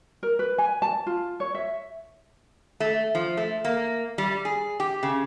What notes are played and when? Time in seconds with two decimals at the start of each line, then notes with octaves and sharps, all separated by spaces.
0.23 A#4
0.39 B4
0.58 G#5
0.82 A5
1.07 F4
1.40 C#5
1.55 E5
2.80 A3
3.15 F3
3.37 A3
3.65 A#3
4.18 G3
4.45 G#4
4.80 G4
5.03 C#3